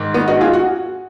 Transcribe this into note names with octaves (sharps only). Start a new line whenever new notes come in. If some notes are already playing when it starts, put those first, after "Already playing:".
Already playing: G#2 D#3
B3
D#4 F#4
F4 G#4
F#4